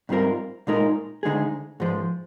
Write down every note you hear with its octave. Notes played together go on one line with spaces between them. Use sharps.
G#2 G3 C4 F4 A#4
A#2 G#3 D#4 A#4
D2 D3 G#3 D#4 G#4
G#2 F3 G#3